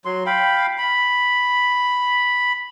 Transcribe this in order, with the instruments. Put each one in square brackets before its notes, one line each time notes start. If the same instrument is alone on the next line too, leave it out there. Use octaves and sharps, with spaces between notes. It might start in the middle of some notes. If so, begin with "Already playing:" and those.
[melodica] F#3 C6
F5 G5 B5
B5